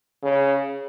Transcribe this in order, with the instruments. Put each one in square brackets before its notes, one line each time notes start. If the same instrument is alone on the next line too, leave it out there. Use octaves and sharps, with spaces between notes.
[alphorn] C#3